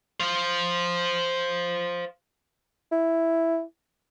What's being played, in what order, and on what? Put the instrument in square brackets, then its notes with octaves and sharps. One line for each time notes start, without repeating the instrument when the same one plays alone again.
[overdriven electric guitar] C5 F5
[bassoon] E4